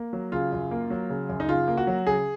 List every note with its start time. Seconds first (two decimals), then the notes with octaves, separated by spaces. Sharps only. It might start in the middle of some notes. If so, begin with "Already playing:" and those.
Already playing: A#3
0.13 F#3
0.32 C#3 F4
0.52 F#2
0.71 A#3
0.90 F#3
1.10 C#3
1.29 F#2
1.40 D#4
1.49 C#3 F4
1.68 A#3
1.77 F#4
1.87 F#3
2.07 C#3 G#4